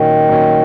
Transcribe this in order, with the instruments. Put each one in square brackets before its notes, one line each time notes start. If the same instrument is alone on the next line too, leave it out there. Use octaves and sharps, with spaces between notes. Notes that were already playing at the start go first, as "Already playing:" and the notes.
Already playing: [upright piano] A#2 F#3 C#4 [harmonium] D#3
[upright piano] A#2 F#3 C#4